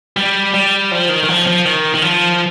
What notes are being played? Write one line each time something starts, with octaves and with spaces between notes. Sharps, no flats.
G3
G3
F3
D#3
D#3
F3
F3
D#3
D#3
F3